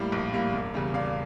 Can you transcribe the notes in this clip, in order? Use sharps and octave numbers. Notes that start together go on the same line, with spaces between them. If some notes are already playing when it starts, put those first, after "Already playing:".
Already playing: A2 G3 A#3 F5
A#1
A2 G3 A#3
E1
E2 C#3 G3
E1 D5 F5